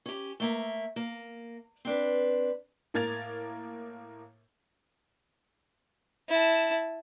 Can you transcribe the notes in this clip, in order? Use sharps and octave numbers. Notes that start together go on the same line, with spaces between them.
C#4 G4
A3 A#3 E5
A#3
C4 D4 B4
A2 A#3 A#4 G#6 A6 F7
E4 A5